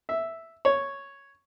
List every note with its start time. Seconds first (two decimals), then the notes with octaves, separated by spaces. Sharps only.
0.09 E5
0.65 C#5